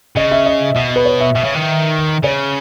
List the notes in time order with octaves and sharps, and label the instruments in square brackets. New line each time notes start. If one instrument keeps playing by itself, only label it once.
[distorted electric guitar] C#3 [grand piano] D#5
[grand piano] E5
D#5
[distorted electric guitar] B2
[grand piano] B4
C#5
E5
[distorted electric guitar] B2 [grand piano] E5
[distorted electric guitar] C#3
D#3
[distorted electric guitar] C#3 [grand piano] C#5